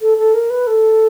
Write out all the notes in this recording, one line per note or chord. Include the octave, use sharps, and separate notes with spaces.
A4
A4
A#4
B4
A4